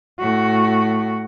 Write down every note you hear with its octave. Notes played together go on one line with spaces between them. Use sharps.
A2 F#4